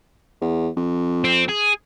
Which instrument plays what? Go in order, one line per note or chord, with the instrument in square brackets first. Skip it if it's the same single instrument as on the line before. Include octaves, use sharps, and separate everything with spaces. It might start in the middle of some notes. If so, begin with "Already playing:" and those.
[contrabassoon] E2
F2
[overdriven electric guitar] C4
G#4